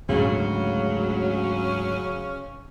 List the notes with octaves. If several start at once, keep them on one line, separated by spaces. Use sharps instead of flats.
D2 G#2 C#3 F#3 A3 C#4